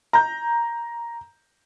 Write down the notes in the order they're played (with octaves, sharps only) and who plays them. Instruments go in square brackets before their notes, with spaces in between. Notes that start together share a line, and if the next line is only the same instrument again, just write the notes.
[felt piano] A#5 G6